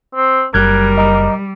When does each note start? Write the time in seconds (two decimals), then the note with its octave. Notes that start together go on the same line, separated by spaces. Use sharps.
0.15 C4
0.54 F#1 G3 A#4 F#6 G#6
0.98 D#5 A#5 D6